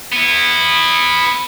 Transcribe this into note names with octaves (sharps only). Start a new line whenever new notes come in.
B3 E4